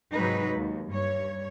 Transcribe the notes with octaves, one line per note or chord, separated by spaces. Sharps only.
G#2 C3 F#3 G#3 D#4 B4
D#2
G2 C#5